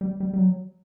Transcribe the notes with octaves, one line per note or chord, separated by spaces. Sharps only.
G3
G3
G3
F#3